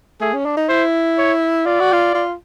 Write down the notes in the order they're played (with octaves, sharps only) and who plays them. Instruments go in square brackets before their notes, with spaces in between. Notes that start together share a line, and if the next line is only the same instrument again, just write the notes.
[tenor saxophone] A3 [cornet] G#4
[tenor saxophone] C#4
D4
D#4
[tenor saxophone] E4 [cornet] C5
[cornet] C#5
[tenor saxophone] F4 [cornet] D5
[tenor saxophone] F#4
F4
F4